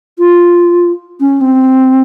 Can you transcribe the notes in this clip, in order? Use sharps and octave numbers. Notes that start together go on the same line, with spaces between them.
F4
C#4
C4